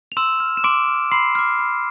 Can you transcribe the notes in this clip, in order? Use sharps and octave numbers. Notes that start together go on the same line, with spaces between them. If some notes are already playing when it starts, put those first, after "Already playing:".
F7
C6 E6 E7
F6
E7
C6 D6 D7
F6
B5 C6 C7
D6 F6
B5